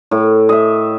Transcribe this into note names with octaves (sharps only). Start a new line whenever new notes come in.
A2
D#5 E5